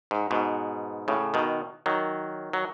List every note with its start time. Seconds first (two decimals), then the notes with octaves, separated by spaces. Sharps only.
0.11 G#2
0.31 G#2 B2
1.08 A2 C#3
1.34 B2 D#3
1.86 D#3 F#3
2.53 F#3